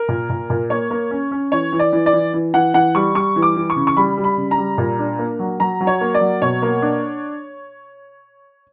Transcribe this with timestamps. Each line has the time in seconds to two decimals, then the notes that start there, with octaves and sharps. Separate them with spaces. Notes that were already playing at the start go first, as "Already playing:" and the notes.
Already playing: A#4
0.09 A#2
0.30 A#2
0.50 A#2
0.70 A#3 C#5
0.90 A#3
1.11 C#4
1.31 C#4
1.52 E3 C#5
1.72 E3
1.79 D5
1.93 E3
2.06 D5
2.13 E3
2.34 E3
2.54 E3 F#5
2.74 E3 F#5
2.95 G3 C#6
3.15 G3 C#6
3.36 E3
3.42 D6
3.56 E3
3.70 C#6
3.76 C#3
3.87 C#6
3.97 G3 B5
4.17 G3
4.24 B5
4.37 C#3
4.51 A#5
4.58 G3
4.78 A#2
4.99 D4
5.19 A#3
5.39 F#3
5.60 F#3 A#5
5.80 F#3
5.87 C#5
6.01 A#3
6.14 D5
6.21 F#3
6.42 B2 C#5
6.62 A#3
6.82 D4